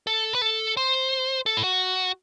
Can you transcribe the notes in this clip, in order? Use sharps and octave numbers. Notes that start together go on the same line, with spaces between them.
A4
B4
A4
C5
A4
E4
F#4